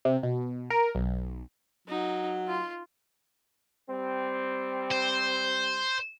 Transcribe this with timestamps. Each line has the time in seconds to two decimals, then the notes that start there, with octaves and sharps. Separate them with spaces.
0.05 C3
0.23 B2
0.70 A#4
0.95 B1
1.88 F#3 D#4
2.48 F4 C6
3.89 G3 C4
4.91 C5